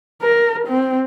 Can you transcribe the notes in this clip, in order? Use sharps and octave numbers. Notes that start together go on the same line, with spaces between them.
A#4
C4